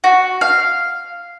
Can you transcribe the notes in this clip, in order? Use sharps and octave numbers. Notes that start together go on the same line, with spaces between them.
F#4
F5